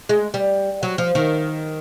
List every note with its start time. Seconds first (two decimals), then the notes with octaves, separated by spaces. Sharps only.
0.09 G#3
0.34 G3
0.83 F#3
0.98 F3
1.15 D#3